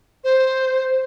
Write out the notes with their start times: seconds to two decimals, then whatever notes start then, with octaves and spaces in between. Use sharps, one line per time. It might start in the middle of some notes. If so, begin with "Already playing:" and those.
0.23 C5